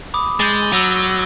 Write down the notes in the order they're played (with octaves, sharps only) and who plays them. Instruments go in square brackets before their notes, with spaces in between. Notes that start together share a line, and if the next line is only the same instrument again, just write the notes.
[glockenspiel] B5 D6 D#6
[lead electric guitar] G#3 [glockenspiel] G6 A6
[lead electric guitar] F#3 [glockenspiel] E6 A#6 D#7